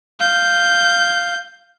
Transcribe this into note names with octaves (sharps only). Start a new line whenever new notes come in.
F5 G6